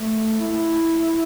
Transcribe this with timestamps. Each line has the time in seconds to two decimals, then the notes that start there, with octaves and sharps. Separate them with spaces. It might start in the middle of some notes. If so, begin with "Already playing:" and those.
Already playing: A3
0.40 E4